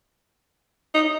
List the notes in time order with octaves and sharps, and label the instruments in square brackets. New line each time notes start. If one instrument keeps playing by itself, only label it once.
[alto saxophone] D#4